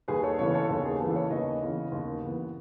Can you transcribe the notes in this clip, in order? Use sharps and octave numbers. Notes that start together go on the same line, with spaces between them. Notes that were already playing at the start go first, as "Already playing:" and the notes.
D#2 G#4 B4
A4 C#5
C#3 E3 B3 A4 C#5
A4 C#5
D#2 A4
G#4
C#3 E3 B3 A4
A4 C#5
D#2 B4 D#5
C#3 E3 B3
D#2
C#3 E3 B3